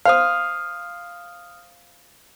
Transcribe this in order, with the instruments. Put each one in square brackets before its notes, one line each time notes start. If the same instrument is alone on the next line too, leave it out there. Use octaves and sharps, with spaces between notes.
[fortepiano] C5 F5 [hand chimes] D#6 F6